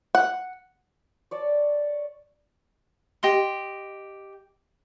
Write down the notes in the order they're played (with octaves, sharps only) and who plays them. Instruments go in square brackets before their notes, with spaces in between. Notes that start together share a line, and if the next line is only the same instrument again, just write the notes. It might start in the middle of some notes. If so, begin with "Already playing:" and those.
[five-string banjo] F#5
[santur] C#5 D5 A5
[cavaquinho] G4 D#5 C6